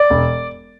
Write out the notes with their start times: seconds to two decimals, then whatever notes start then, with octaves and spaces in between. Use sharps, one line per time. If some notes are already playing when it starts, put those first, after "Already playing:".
Already playing: D5
0.10 E1